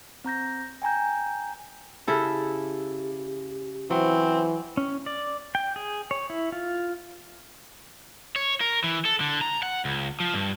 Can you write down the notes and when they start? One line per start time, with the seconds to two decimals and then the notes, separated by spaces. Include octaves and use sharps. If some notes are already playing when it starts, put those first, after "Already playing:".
0.24 C4 A#5 G6 A#6
0.82 G5 G#5 A#5 G6
2.07 C#3 E4 G4 A4
3.91 E3 F#3 C4 C5
4.77 C#4
5.06 D5
5.55 G5
5.76 G#4
6.11 C#5
6.30 E4
6.52 F4
8.36 C#5
8.61 A#4
8.84 E3
9.05 A4
9.20 D3
9.41 A#5
9.62 F#5
9.85 C#2
10.20 F3
10.34 G2